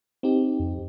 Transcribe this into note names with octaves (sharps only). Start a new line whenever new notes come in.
C4 D#4 G4
F2